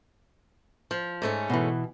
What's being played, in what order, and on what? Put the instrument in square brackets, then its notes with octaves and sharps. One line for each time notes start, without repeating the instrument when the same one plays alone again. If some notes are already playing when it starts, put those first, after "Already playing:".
[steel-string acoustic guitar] F3
G#2 A3 C#4
[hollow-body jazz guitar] B2 E3